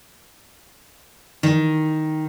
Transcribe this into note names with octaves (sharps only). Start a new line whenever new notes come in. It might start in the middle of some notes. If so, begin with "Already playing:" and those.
D#3